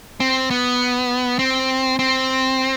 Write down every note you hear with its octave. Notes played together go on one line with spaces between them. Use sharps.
C4
B3
C4
C4